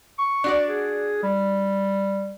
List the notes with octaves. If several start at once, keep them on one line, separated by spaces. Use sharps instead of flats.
C#6
D4 F#4 D5
G#4
G3